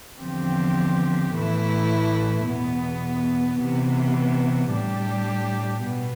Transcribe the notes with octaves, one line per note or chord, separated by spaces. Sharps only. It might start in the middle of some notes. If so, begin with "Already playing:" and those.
E2 D3 F3 C4 G4
A2 E3 A3 E4
E2 B2 B3
C3 E3 B3
A2 G3 D4 G4
B2 B3